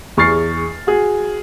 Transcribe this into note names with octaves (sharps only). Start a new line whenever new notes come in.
E2 G#4 C#6 F6 A6 C7
F#4 G#4